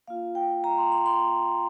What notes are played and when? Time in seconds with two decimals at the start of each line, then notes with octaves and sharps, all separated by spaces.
0.08 A#3 F4 F5
0.35 G5
0.64 A#5
0.78 C6
0.92 C6
1.06 C6